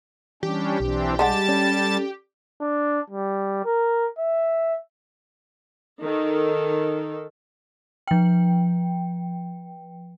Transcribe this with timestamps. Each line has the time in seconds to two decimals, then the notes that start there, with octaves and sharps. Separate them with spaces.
0.43 E3 G3 C#4 D4 G4
0.80 B1 E3 C4 D4
1.19 G3 G#3 D4 F#5 A5 A6
1.49 C#4 A4 D5
2.61 D4
3.10 G3
3.65 A#4
4.19 E5
6.02 D#3 A4
8.07 F3 G5